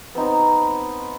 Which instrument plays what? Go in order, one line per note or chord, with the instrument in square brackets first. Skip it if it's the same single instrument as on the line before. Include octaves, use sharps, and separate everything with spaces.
[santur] B3 C4 D#4